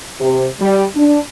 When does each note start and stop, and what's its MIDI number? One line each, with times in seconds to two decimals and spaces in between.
0.19 0.46 48
0.60 0.83 55
0.95 1.19 62